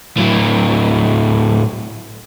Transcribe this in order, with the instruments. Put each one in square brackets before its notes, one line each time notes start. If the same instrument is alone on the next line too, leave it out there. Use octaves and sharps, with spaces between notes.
[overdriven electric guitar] A2 F#3